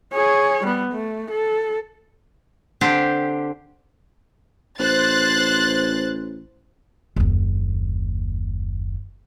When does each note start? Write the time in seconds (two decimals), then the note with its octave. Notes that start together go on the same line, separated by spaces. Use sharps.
0.14 G#4 C#5
0.64 G3 B3
0.93 A3
1.31 A4
2.81 D3 C4 D4 G4
4.79 A1 C5 F#6 A6
7.16 F#1 D#2